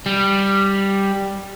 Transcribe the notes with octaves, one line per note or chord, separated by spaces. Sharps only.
G3